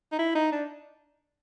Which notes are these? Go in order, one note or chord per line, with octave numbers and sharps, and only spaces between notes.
D#4
E4
D#4
D4